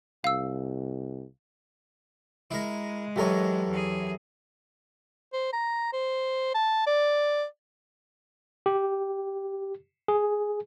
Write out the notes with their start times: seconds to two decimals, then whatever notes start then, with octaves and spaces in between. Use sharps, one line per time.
0.24 C2 F5 E6
2.51 G#3 E4 A#4
3.16 F#2 E3 G4 A4 A#4 C#5
3.69 E2 G#4
5.33 C5
5.53 A#5
5.93 C5
6.55 A5
6.87 D5
8.66 G4
10.08 G#4